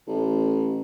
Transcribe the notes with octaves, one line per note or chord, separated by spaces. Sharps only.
A1